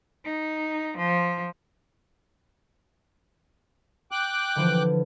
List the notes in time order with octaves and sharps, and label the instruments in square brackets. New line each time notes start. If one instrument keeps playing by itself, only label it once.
[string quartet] D#4
F3
[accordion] G5 D6 F#6
[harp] D3 E3 F3